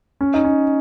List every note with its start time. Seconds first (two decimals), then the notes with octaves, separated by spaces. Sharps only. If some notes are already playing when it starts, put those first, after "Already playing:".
0.21 C#4
0.34 D#4
0.44 C#4